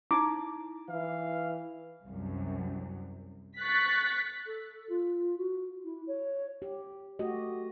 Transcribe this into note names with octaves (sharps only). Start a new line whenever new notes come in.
D#4 E4 D6
E3 F5
C2 F#2
C#6 F#6 A6 B6
A4
F4
F#4
E4
C#5
G4
A3 F#4 G4 D#5